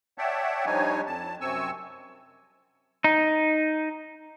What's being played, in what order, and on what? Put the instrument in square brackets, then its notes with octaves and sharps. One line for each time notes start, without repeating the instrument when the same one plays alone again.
[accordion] C#5 D5 E5 F#5 G5 A5
F3 G3 D4 D#4 C#5 G#5
F2 A5
F#2 C3 C4 G#5 C#6 E6
[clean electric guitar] D#4